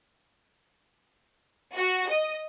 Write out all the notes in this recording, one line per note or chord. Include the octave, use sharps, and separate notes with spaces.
F#4
D#5